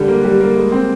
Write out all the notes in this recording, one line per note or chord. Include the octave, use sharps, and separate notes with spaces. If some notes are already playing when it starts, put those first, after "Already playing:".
Already playing: D3 G3
A#3
G3
A#3
G#3
C4